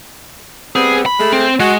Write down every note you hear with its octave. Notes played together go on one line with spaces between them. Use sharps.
G3 B3 C4 G#4
B5
G#3 A3
C4
G#3 F#4